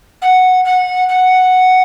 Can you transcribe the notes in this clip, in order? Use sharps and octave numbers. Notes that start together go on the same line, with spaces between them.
F#5
F#5
F#5